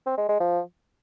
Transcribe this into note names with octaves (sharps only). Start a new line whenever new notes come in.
C4
G#3
G#3
F3